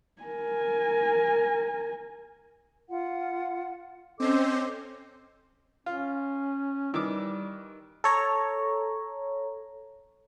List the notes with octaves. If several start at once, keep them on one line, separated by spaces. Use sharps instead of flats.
A#4 G#5
F4 F#5
C4 C#4 A4 C5 D#5 D6
C#4 F4
D#3 E3 G3 D6
A4 C#5 A#5